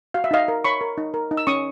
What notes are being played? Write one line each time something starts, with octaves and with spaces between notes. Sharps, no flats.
F#4 F5
E5
D#4 D#5 F5
A#4
C#5 B5 C#6
A#4
D#4
A#4
D#4
E6
C#4 C#6 D#6